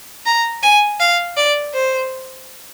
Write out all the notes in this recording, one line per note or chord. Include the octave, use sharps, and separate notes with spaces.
A#5
G#5
F5
D5
C5